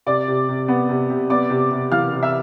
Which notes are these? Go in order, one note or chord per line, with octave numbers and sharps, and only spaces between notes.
C3 D5 D6
C3
C3
B3
C3
C3
B3 D5 D6
C3
C3
E3 F5 F6
C3
E5 E6